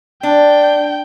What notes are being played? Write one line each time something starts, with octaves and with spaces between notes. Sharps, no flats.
D4 G5